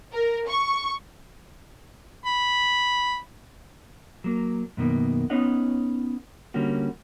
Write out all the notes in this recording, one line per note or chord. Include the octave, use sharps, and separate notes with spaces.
A#4
C#6
B5
F#3 A#3
F#2 B2 D#3 A#3
B3 C#4 D#4 C#5 D#5 F#5
D3 G3 A#3 C#4 F#4